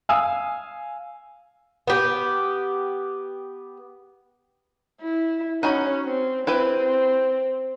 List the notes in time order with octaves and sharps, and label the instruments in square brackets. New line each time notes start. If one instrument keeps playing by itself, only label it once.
[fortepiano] F5 G#5 D#6 E6
[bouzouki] B3 G4
[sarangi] E4
[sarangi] C#4 [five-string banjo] D#4 F#4 B5
[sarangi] C4
[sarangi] C4 [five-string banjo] E4 G4 B4